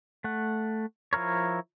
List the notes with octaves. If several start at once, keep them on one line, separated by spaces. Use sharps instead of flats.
A3 F#5
F3 E4 A#4 C#5